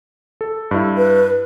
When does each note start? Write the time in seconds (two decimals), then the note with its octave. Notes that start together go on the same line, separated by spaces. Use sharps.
0.41 A4
0.71 G2 E4
0.97 B4